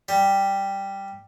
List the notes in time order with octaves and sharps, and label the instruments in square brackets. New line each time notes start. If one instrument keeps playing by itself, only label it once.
[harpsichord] G3